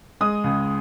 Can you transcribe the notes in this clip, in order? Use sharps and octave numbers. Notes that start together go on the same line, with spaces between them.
G#3 D#6
C#2